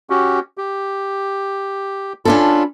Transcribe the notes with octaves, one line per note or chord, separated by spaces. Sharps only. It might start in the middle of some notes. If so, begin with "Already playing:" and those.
C#4 F#4 G4
G4
C#4 D4 F4 A4 B5